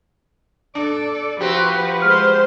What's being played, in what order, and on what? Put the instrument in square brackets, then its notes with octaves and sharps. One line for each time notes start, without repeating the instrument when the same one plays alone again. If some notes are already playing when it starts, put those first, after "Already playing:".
[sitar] D4 [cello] A4 D5
[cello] F3 B4 [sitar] C4 F#4 G4 [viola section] C5
[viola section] G#3 C5 [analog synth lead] F6